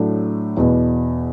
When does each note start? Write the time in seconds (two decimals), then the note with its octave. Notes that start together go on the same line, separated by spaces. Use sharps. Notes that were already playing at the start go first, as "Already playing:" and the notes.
Already playing: A2 F#3 A3 D4
0.57 E2 B2 B3